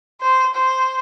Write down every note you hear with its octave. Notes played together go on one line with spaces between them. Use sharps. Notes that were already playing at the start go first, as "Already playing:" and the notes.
C5
C5